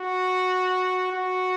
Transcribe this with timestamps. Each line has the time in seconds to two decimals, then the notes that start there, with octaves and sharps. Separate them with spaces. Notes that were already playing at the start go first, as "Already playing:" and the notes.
Already playing: F#4
1.12 F#4